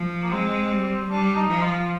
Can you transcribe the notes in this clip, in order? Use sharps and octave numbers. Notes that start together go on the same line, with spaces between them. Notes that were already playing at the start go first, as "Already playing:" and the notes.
Already playing: F3
A#3
G#3 C4
G3
G3 D4
D#4
F3
F4